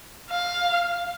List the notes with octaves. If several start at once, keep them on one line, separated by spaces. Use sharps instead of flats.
F5